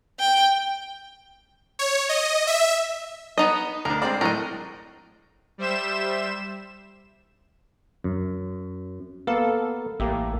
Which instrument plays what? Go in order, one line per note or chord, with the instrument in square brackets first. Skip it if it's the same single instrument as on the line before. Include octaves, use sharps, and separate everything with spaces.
[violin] G5
[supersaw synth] C#5
D#5
E5
[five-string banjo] B3 D#4 D#5
[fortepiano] D2 D4 [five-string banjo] A#4
[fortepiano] G#3 C4 D5
[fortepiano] A2 F#3 [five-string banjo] A#4 D#5
[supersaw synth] G3 C5 E5 E7
[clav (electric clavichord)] F#2
[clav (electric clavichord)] A#3 B3 F5 [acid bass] A4
[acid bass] A1 [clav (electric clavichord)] A#3 G4 E5